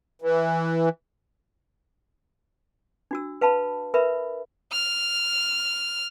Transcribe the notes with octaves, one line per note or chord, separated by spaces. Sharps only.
E3
D4 F#4 E6
B4 F5 A5 B5
A#4 B4 E5 B5
F6